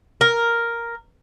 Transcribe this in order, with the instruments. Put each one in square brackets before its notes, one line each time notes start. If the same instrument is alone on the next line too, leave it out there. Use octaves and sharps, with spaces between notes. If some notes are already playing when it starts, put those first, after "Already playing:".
[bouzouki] A#4